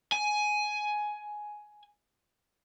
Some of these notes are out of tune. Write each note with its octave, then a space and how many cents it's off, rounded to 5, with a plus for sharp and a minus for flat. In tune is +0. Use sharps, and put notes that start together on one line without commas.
G#5 +10